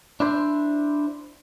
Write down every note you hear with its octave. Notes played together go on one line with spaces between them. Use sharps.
D4 E4 C5